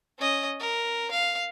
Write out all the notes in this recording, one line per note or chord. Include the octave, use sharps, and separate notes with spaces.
C#4 D#5
A#4
F5